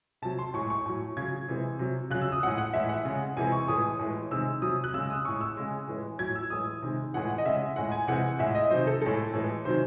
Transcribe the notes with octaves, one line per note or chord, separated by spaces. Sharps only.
C3 F#3 A5
C6
A2 G#3 C#6
C#6
A2 F#3
C#3 F#3 G#6
C3 E3 G#3
C3 F#3
C#3 F#3 F#6
E6
D#6
A2 G#3 F#5
F#5
A2 E3 G#3 E5
F#5
C#3 G#3
C3 E3 G#3 G#5
C#6
A2 E3 G#3 D#6
A2 E3 G#3
C3 D#3 G#3 E6
C3 F#3 D#6
F#6
C#3 G#3 E6
D#6
A2 G#3 C#6
E6
C#3 G#3
A2 E3 G#3
A2 F#3 G#6
E6
A2 E3 G#3 D#6
C3 D#3 G#3
A2 E3 G#3 F#5
F#5
D#5
C#3 G#3 E5
A2 G#3 F#5
G#5
C3 E3 G#3 F#5
A2 G#3 E5
D#5
C3 D#3 F#3 C5
A4
A2 G#3 A4
A2 E3 G#3
C3 D#3 F#3 C5